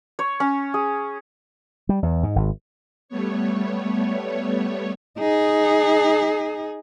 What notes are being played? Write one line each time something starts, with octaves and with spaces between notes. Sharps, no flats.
C#5
C#4
G#4
G3
E2
G#2
G#1
G3 A3 B3 C#5
D#4 G#4